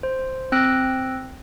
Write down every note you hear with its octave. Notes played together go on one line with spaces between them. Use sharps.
C5
C4 E6 F#6 A#6 D7